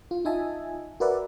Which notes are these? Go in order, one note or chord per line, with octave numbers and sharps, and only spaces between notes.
F4
D#4 F4 D#5 E5 G#5 A5
F#4 A#4 B4 D5 E5 F#5